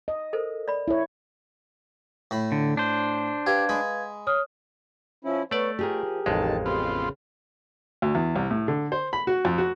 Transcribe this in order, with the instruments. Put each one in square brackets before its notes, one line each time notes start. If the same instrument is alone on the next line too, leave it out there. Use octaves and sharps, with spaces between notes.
[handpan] D#5
[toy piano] A4 A#4 C5
D5 B5
[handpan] E4 C#5
[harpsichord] A2 B5
[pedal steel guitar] D3
D4 C5
[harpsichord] G4 [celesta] B4 F5 G#6
[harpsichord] G#3 B5
[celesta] C#5 D#6 F6
[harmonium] F3 C#4 E4
[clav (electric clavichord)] A3 D5 [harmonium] B3 C#5
[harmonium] F3 [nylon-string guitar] G4 G#4 A#4
[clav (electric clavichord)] A1 F2 G#3 [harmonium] D#3 A5
[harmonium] C#3 [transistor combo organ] B3 C4 F4
[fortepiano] D2
E2
C2
A2
D3
C5
B5
F#4
F2
F#4